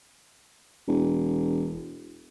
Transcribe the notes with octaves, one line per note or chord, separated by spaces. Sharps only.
E1